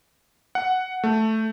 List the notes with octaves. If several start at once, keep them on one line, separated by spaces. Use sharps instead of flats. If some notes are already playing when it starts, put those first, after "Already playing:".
F#5
A3